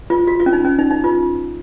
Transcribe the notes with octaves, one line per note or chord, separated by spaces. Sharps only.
F4
F#4
F4
C#4
D#4
C#4
D#4
D#4
F4